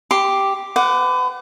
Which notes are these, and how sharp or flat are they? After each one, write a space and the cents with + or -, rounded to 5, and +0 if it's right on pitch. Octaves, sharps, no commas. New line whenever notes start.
G4 +0 C6 +0
B4 +40 F#5 +0 D6 +0